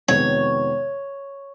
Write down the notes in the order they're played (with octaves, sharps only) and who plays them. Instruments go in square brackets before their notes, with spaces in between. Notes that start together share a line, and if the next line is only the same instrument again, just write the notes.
[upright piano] F2 C3 D#3 G#3 B3 [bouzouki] C#5